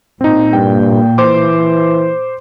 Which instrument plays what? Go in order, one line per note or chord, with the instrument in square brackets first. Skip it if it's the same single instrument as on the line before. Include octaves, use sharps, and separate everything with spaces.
[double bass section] A#2 [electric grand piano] C4 D#4
[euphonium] G2 [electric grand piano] G5
[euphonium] E3 [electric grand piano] C5 C6 D6